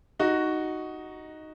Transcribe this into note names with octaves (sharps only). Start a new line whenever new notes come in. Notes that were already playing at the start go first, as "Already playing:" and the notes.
D#4 F#4